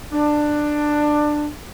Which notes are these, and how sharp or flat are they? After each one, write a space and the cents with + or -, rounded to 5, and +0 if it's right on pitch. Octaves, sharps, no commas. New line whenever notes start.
D4 +15